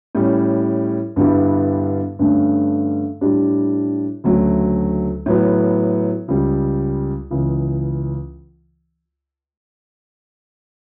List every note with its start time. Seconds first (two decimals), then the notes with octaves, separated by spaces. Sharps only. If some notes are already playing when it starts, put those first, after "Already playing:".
0.15 A2 G3 C#4
1.16 G2 D3 G3 B3 E4
2.19 G2 D3 A3 C#4
3.21 A2 G3 D4 G4
4.24 D2 C#3 F#3 A3
5.26 A2 F#3 B3
6.28 C#2 C#3 G3
7.31 C#2 C#3 E3